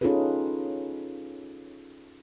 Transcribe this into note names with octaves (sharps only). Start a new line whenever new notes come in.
C#4 D#4 F4 G#4 A4 B4